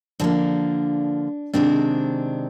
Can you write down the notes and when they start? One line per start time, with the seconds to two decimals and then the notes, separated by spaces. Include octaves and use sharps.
0.20 D3 F3 A#3 C4 D4
1.53 C3 D#3 G#3 C4 D4